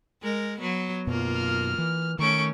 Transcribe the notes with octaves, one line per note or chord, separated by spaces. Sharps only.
G#3 A#4
F#3 B3
F#2 B2 A#3 F4 A#4
F6
E3
D#3 A3 C#4 C#6 D7